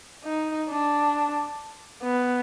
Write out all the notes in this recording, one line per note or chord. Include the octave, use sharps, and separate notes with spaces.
D#4
D4
B3